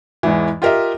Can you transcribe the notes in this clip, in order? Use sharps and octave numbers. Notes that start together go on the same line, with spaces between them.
E2 G#2 E3
F4 G4 A#4 D#5 E5